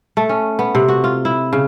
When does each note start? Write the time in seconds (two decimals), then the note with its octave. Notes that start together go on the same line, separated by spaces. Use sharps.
0.17 A3
0.29 C#4
0.59 B3
0.75 C3
0.88 F#4
1.04 F4
1.25 E4
1.53 C#3